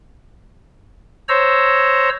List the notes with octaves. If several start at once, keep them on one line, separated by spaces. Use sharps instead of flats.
C5 C#5 A#5 E6